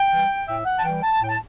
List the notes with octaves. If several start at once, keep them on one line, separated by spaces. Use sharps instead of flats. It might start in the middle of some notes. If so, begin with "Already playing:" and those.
Already playing: G5
E3 G3
A2 E5
F#5
A5
E3 G3 G5
A5
A2 G5
A5